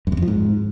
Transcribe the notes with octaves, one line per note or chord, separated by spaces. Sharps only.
F#2
E2
F2
F3
G#2